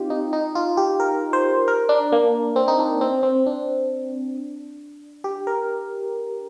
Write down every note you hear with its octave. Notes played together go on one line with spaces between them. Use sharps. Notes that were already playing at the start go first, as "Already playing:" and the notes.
Already playing: C4 D#4 F4 G4
D#4
D#4
F4
G4
A#4
C5
A#4
D4
A#3
C4
D#4
D4
C4
C4
D4
G4
A#4